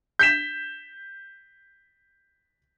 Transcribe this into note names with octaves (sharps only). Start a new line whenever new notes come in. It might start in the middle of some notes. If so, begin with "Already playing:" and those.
G6 B6 E7